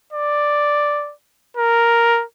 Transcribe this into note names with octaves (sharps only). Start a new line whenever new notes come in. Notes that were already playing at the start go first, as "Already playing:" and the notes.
D5
A#4